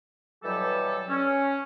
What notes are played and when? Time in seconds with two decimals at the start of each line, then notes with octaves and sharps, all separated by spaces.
0.44 B2 E3 F#3 G3 G4 A4
1.09 C#4